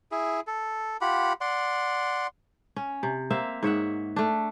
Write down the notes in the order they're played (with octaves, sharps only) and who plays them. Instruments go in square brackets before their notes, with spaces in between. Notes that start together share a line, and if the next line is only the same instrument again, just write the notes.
[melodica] E4 G#4
A4
F4 G4 F#5 B5
D5 F#5 C6
[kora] C#4
C3
A#3 C4 E5 F5
G#2 C#5 E5 F#5
A3 D4